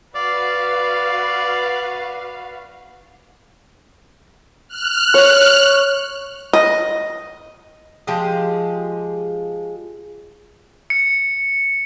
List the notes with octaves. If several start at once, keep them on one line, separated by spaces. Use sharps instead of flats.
F#4 B4 D5 F5
F6 F#6
C#5
D#5
F3 G#3 G4 G#4
C#7